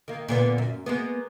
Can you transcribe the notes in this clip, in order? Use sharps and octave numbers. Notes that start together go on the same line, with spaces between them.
D#3 A#3
A#2 D3 B3
F#2
G#3 A#3 B3